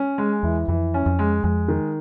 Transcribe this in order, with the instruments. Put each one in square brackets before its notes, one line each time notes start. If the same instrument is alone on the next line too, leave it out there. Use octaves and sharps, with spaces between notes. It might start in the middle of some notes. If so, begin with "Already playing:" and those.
Already playing: [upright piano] C#4
G#3
[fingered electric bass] E2 [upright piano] E3
[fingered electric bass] F2 [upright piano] E3
[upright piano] C#4
[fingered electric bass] F2
[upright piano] G#3
[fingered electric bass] F2 [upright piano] G#3
[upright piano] D#3